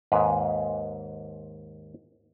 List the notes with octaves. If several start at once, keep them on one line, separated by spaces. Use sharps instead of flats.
D#2 G#2 B4 F5